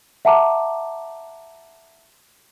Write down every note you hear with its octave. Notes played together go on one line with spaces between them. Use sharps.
E5 F#5 A5 A#5 D6